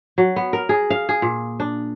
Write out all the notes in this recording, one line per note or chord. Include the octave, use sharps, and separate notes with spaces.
F#3
B3
A#4
G#4
F5
G#4
A#2
D4